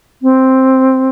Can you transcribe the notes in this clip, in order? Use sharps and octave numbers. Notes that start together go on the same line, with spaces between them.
C4